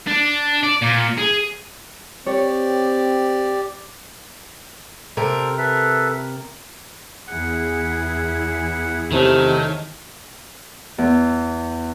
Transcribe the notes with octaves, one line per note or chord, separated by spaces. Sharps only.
D4
D5
A#2
G#4
C4 G4 C#5 D5
C3 A4 A#4 C5
A4 B4 E5
E2 E4 G#4 F#5
C3 D#3 F#3 A3
E2